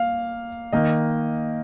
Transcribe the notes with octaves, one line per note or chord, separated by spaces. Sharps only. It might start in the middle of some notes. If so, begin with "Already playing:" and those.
Already playing: A#3 F5
D#3 A#3 D#5